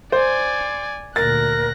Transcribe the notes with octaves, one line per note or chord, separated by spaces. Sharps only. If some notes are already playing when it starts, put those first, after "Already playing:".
C5 D5 G#5
D2 A#2 A#4 F#6 A6 A#6